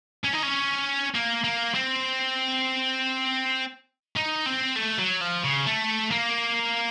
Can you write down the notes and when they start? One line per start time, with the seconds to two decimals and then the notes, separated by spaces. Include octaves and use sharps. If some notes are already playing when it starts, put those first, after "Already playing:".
0.24 C#4
0.33 D#4
0.43 C#4
1.15 A#3
1.44 A#3
1.75 C4
4.16 D#4
4.46 C4
4.76 A3
4.99 F#3
5.21 F3
5.44 C#3
5.67 A3
6.12 A#3